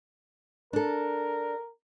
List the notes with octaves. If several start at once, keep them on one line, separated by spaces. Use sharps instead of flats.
D4 A4 A#4